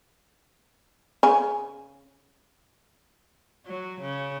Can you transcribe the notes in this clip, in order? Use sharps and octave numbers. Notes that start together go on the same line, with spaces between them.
C#3 G#5
F#3
C#3